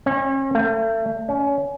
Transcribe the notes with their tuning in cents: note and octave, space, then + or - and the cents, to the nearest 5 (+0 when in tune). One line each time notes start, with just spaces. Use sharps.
C#4 -40
A3 +35
C#4 +25